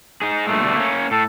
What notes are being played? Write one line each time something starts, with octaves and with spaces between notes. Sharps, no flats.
D#4 G#4
G2 A#2 G#3 A3
B2 D3 G3
A#3 C#4
A2 A4